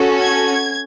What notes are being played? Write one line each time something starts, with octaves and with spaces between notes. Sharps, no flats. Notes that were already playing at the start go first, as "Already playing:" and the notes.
Already playing: C#4 F#4 A4
G#6